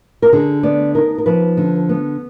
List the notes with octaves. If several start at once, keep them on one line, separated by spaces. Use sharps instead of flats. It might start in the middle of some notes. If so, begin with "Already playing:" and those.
A#4
D3 G#4
B3 D5
D#4 A#4
A#4
F3 B4
D3
B3